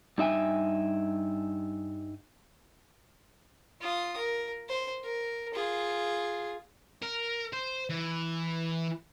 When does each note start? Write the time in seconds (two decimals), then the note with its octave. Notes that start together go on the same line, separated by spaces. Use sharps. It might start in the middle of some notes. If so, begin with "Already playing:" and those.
0.18 G2 D#4 E5 G5 G#5
3.81 F4 D#6
4.17 A#4
4.69 C5
5.04 A#4
5.54 F4 G#4
7.02 A#4
7.53 C5
7.90 E3